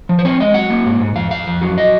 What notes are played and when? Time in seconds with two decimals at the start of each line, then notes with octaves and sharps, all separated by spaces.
0.09 F3
0.19 C5
0.25 C4 C#5
0.40 G#3 D#5
0.54 F#3 F#5
0.70 A#3
0.86 G#2
1.00 G#2
1.15 F2 F5
1.30 F2 F5
1.47 F2
1.61 F#3
1.78 D#5